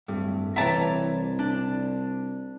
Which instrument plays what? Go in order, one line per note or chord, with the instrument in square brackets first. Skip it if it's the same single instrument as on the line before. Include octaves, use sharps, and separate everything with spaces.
[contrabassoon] D1 [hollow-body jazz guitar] G2 [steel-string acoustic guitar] A3
[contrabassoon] C2 [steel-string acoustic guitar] E3 C#5 A#5 [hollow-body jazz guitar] E5 G5 A5
[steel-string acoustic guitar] D4